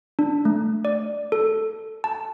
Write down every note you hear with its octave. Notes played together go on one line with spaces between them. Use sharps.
D4
A3
D5
A4
A5